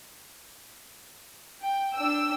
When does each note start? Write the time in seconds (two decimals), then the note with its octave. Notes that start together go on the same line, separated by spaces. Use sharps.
1.63 G5
1.97 D4 G5 E6